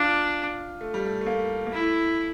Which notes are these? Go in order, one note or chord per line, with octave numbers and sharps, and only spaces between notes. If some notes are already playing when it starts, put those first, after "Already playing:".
Already playing: D4 F4
A3
G3
A3
A3
A#3
A#3
A3 E4